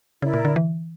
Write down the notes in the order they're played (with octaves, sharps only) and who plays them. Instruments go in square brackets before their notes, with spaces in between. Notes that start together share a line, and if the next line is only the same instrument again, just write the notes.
[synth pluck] C#3 [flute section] E4 A#4 D5
[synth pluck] A#2
D3
E3